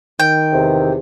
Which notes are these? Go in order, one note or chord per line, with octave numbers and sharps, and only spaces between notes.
D#3 G5
E2 C3